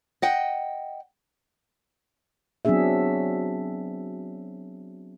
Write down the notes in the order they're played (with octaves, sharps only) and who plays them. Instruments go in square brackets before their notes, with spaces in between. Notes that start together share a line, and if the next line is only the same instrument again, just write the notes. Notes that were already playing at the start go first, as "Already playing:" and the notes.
[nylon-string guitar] D#5 F#5 G5
[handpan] F#3 B3 C4 D4 G#4 E5